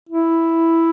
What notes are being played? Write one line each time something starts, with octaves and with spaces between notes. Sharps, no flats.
E4